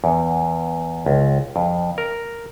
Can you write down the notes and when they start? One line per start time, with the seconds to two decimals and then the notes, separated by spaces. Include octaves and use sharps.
0.04 E2
1.06 C#2
1.56 F2
1.98 A#4